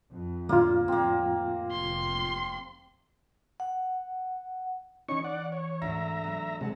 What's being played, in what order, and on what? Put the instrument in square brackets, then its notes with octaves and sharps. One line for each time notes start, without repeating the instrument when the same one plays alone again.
[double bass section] F2
[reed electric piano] D2 A2 F4 [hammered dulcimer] A#3
[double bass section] F2 [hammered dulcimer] A#3 C4
[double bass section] F1 [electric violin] C6
[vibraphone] F#5
[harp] E3 B3 [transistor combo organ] C#4 D#4 C#6
[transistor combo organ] D5 F#5
C#5
[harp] D2 G#2 [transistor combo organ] E5 A#5
[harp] F#3 B3
[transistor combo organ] C3 G#3 [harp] B4 F#5 A5